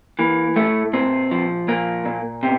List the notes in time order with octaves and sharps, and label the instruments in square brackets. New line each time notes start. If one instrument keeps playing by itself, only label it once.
[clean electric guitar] E3 A#3
A2 A3
A#2 C4
F3
A#2 A#3
A#2
C3